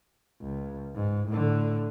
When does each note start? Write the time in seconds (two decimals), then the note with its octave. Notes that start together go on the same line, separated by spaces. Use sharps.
0.41 C#2
0.95 G#2
1.29 A2 D3